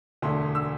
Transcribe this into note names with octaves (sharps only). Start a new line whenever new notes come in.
E1 D2 D3 A3 C6
E6